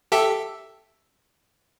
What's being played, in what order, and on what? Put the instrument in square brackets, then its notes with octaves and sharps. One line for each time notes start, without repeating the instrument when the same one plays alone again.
[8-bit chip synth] G4 A4 E5